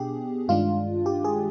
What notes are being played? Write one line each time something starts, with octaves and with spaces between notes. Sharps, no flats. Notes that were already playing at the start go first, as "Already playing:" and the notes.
Already playing: B2 B3 D4 G4 G#4
G2 D#3 G#3 D4 F4
G4
G#4